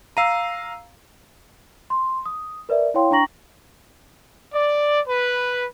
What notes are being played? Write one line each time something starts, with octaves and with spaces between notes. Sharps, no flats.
F5 A#5 E6 C7 D#7
C6
D#6
A#4 B4 D5 E5
E4 C#5 F5 G5 C6
D4 G5 A#5 C#6 A#6 F#7
D5
B4